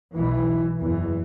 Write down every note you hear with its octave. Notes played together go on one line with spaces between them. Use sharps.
B1 B2 E3
F#1 E2 B2 E3